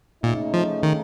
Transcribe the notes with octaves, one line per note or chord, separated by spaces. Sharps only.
A#2 C#3 A3 D#4
F3
D#3